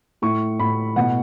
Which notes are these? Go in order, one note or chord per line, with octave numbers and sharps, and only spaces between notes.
A2 C#6
A2 B5
B2 F#5